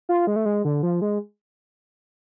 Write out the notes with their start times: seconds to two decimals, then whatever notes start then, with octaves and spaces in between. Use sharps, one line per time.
0.09 F4
0.27 G#3
0.36 A3
0.46 G#3
0.65 D3
0.83 F3
1.02 G#3